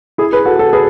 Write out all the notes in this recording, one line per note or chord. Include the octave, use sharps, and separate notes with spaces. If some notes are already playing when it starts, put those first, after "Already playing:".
E4 G#4
G#4 B4
F#4 A4
F#4 A4
G#4 B4